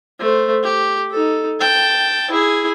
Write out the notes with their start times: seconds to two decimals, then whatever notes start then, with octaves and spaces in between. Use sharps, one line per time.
0.19 A3 C5
0.63 G4
1.11 D#4 A4
1.60 G5 A5
2.30 E4 G#4